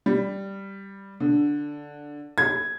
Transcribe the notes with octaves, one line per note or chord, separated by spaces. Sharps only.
G3
D3
G#6